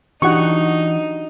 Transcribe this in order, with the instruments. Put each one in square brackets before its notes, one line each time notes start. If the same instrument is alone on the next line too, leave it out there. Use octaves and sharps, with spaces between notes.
[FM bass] E3 [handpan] D4 F#4 G4 [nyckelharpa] D#4 [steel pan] F#5 C#6